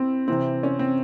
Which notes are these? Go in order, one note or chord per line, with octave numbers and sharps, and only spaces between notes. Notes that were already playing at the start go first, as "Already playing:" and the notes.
Already playing: C4 E4
C3 E3 C4
C#4
C4